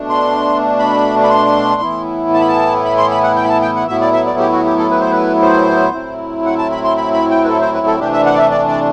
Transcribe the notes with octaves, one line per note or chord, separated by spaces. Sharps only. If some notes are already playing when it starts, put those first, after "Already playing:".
Already playing: B2 A3 D4
C6
B5
B5
C6
A2 E3 B3 E4
A5
B5
A5
B5
C6
B5
F#5
G5
B5
A5
G5
F#5
A2 F#3 B3 E4 E5
D5
E5
D5
G4
F#4
G4
A4
B4
C5
B4
C5
A2 F#3 C4 E4
F#5
A5
B5
C6
B5
B5
G5
B4
A4
C5
B4
A4
C3 E3 A3 D4 G4
E5
F#5
D5
E5
D5
D5